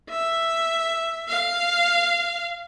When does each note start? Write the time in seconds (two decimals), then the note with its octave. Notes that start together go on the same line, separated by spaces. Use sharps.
0.10 E5
1.28 F5